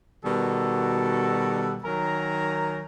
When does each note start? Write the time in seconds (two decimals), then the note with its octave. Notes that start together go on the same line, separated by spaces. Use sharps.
0.24 B2 D#3 G3 F#4 A4
1.83 D#3 F#3 A#4 G#5 A#5